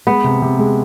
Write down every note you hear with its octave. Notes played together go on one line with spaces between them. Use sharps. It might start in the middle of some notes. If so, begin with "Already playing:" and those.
G#3 B3
C3
C3
G#3